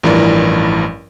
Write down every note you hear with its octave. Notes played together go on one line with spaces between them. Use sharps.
A1 G2 E3 F3 A#4 D5